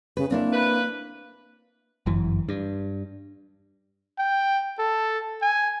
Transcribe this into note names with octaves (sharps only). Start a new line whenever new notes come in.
C#3 B4
A#3 C4 D4 E4
B4
G1 F#2 E3
G2
G5
A4
G#5